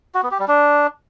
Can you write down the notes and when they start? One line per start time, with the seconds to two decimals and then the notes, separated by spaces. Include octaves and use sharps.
0.15 F#4
0.23 B3
0.31 G4
0.39 G3
0.48 D4